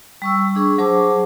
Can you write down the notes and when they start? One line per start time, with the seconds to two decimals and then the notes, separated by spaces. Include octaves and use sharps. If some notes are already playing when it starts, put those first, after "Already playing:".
0.22 G3 C#6 E6
0.55 D4 G#4 C#6
0.78 F#3 G#4 C5 A5 D6